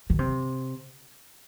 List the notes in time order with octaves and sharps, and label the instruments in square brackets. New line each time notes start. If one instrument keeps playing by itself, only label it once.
[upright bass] D#3
C3